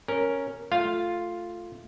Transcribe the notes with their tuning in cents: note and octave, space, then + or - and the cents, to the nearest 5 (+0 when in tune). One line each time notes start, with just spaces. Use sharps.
C#4 +0 A#4 +0
A3 +0 F4 +0 F5 +0